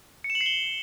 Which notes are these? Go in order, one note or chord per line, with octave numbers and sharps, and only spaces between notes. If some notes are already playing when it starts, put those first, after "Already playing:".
C#7
E7
F#7
C7
G7